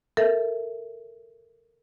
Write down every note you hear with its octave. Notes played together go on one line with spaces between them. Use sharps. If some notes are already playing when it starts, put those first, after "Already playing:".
A4 A#4 E5